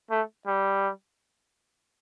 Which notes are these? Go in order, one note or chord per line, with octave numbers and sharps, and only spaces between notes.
A3
G3